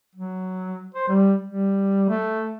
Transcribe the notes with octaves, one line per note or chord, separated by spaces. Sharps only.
F#3
C5
G3
G3
A3